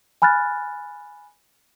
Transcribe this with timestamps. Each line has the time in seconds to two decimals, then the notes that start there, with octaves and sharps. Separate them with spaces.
0.22 G#5 B5 F6 F#6 A6